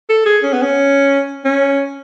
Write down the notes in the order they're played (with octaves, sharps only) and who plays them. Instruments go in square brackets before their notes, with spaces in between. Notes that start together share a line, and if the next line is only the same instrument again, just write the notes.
[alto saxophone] A4
G#4
C#4
B3
C#4
C#4